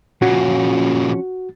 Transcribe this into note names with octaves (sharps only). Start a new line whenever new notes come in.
A#2 C#3 F3 C#4 F#4